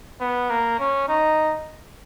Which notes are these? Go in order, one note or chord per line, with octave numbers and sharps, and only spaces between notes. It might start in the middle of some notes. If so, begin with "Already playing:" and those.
B3
A#3
C#4
D#4